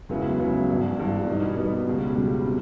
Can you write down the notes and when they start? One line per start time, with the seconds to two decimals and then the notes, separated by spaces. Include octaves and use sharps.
0.09 C#2 C#3 F#3 B3 E4
0.38 C#2 C#3 F#3 B3 E4
0.68 G#1 G2 E3
0.97 G#1 G2 E3
1.27 B2 G3 B3 D#4
1.56 B2 G3 B3 D#4
1.87 C#2 B2 G3
2.16 C#2 B2 G3
2.46 C3